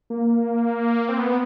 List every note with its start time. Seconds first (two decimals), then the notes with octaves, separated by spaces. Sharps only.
0.10 A#3
1.09 C4
1.19 B3